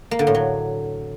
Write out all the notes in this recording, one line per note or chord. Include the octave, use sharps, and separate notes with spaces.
A#3
D3
A2
F#3